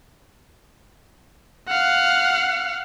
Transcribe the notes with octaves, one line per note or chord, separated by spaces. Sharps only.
F5 F#5